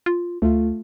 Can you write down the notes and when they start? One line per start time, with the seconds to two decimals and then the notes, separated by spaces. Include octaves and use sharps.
0.06 F4
0.42 D2 A3 F4